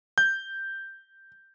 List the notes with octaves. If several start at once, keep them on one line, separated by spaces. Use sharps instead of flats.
G6